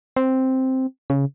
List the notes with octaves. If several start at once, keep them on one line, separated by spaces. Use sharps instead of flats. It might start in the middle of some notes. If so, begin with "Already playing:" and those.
C4
C#3